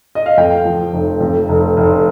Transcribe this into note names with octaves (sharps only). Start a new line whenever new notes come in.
D#5
F5
F2 G5
F3
F1
F2
F1
F1